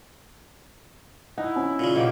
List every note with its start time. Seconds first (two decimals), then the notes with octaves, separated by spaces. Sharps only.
1.38 D#4 E4 F#5
1.56 C#4
1.79 A#2 C#3
1.96 B2 A#3 G4